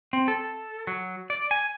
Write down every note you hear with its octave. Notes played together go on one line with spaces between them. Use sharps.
C4
A4
F#3
D5
G#5